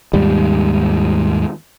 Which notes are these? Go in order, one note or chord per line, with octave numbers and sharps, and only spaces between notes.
D#2 G#2 G3